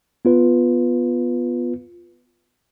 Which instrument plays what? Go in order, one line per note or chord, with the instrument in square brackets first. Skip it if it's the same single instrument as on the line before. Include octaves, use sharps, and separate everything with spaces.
[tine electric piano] B3 F4 B4